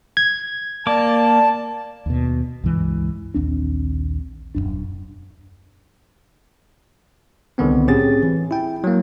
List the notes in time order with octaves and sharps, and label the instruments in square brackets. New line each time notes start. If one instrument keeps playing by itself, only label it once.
[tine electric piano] G#6
[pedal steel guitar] A#3 D6 [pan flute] D5 [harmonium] A5
[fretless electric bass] D#2 B2
C#2 G2 E3 G#3
A#1 D#2 C4 D4
D#1 G#1 F#2 D4
[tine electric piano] C2 D3 D#3 B3 C4
A2 C4 C#4 G4 G#4 A6
E3
E4 G5
F#3 A#3